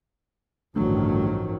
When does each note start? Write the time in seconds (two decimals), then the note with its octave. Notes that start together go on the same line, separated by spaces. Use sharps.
0.76 A1 D2 G2 D#3 F3 F#3